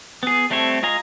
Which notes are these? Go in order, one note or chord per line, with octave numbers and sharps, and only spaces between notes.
B3 G#4
G3 A3 C4 A4 C#5
G#3 F4 D#5 G#5 A#5